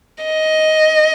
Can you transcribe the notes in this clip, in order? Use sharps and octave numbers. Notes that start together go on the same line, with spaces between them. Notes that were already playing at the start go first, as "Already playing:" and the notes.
D#5